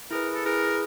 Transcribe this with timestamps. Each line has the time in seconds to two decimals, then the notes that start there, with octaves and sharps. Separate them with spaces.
0.11 E4 G#4 A#4 B4
0.34 A4
0.45 E4 G#4 A#4 B4